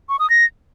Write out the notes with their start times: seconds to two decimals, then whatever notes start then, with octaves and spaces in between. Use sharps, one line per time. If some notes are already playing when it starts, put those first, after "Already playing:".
0.09 C#6
0.19 D#6
0.30 A#6